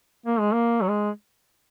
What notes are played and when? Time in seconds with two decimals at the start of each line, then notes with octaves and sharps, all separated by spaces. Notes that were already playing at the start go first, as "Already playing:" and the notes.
0.26 A#3
0.40 G#3
0.53 A#3
0.81 F#3
0.88 G#3